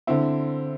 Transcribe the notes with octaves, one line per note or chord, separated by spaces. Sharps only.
D3 C4 E4